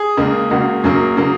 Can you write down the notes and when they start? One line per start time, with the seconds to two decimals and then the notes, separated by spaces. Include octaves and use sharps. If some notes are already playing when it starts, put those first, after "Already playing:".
Already playing: G#4
0.17 C#2 C#3 A#3
0.50 C#2 C#3 A#3 F#4
0.83 F#2 C#3 F#3 A#3
1.17 C#3 F#3 A#3